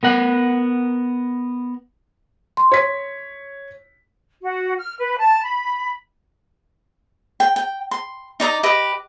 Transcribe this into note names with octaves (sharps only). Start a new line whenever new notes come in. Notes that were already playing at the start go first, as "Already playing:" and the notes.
B3 A#4 F#5
C6
C#5 B6
F#4
F6
B4
A5
B5
G5
G5
C6
D#4 D5 A#5 D#6
G4 B4 D#5 D#6